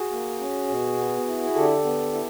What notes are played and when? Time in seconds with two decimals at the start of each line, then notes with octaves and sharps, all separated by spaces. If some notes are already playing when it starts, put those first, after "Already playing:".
Already playing: F#4 G#4
0.11 A#3
0.39 C#4
0.68 B2
0.97 B3
1.27 E4
1.55 D3 G4 A4
1.84 B3
2.13 E4